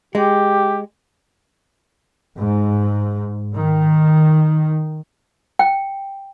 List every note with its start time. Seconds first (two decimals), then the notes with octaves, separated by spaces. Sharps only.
0.15 G#3 G4
2.37 G#2
3.54 D#3
5.59 G5